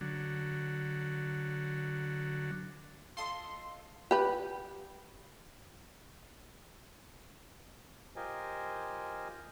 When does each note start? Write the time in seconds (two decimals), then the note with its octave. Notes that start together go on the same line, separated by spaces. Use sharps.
0.01 D3 F#3
3.17 F4 A4 D#5 C6
4.11 G4 B4
8.16 F4 G4 A#4 C5 D#5 G#5